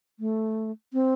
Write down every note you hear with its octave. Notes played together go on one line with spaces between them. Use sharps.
A3
C4